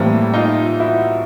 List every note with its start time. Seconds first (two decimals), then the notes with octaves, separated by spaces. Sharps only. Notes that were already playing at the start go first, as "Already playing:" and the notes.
Already playing: A2 E3 G3 A#3 C4
0.33 D#4 F4
0.80 E4 F#4